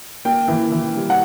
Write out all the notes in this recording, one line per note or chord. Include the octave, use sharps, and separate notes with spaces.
A#3 G5
E3
E3
G3
F#5